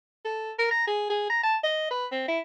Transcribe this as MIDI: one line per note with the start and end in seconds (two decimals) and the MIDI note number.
0.25 0.52 69
0.59 0.66 70
0.71 0.86 82
0.87 1.06 68
1.10 1.25 68
1.30 1.39 82
1.43 1.57 81
1.64 1.87 75
1.91 2.06 71
2.12 2.26 60
2.28 2.40 64